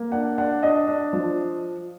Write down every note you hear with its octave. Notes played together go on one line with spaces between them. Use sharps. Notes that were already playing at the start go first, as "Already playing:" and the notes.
Already playing: A#3
D4 F#5
D4 F#5
D4 D#5
D4
F3